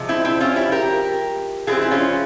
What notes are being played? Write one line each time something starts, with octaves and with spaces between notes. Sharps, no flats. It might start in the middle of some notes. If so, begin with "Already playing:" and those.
Already playing: C3 F3 G#3
C4 E4
C4 E4
C#4 F4
E4 G4
G4 A#4
E3 G#3 C4 F4 G#4
E4
C#4 F4